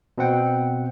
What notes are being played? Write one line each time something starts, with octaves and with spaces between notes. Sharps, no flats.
B2 C4 F#5 G5